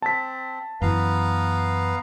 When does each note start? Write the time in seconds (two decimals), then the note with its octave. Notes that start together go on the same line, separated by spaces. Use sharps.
0.02 C4 A5 B6
0.82 F#2 E3 B3 B4 F5 A#5